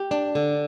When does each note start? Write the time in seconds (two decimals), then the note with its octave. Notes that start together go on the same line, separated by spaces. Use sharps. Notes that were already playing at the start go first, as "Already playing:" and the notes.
Already playing: G4
0.11 D4
0.35 D3